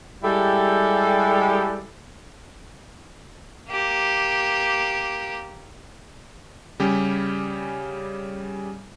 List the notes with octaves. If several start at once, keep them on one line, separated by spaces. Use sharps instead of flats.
G3 G#3 E4 G4 A4
A#3 G4
C#3 G3 C#4 G4